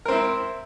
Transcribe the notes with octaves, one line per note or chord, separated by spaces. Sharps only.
C4 E4 A#4